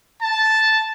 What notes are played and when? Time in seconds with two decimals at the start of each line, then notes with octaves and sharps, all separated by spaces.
0.22 A5